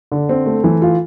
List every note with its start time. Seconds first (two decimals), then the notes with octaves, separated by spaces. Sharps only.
0.12 D3
0.29 C4
0.46 A3
0.64 E3
0.82 F4